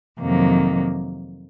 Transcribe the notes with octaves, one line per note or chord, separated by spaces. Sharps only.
F2 C3 D#3 F#3 A#3